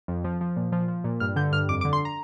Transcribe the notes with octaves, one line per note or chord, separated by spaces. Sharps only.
F2
F3
F3
A#2
F3
F3
A#2
G2 F6
D3 G6
G2 F6
F2 D6
D6
D3
C6
A#5